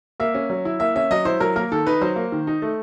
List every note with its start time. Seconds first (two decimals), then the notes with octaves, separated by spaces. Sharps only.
0.20 A#3 E5
0.35 C#4
0.50 F#3
0.65 E4
0.80 A#3 E5
0.96 C#4 E5
1.11 F#3 D#5
1.25 E4 C5
1.40 F#3 A#4
1.56 A#3 A#4
1.72 D#3 A4
1.87 D#4 B4
2.01 F#3 C5
2.16 A#3
2.32 D#3
2.47 D#4
2.62 A3